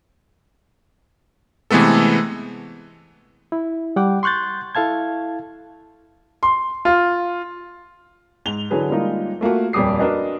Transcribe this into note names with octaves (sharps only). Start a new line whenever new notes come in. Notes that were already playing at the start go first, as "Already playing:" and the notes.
C3 E3 G#3 A3 B3 A4
E4
G3 F#5 G5 D6
C6 C#6 F#6 G6 A6
E4 A4 F5 A5 G#6
C6
F4
G#2 F7 G7
D3 E3 F#3 G#4 B4
G3 G#3 A#3 D#4 F4
A3 A#3 F4 F#4
D#1 F2 G3 D6 D#6 C7
D4 F#4 A#4 B4 D#5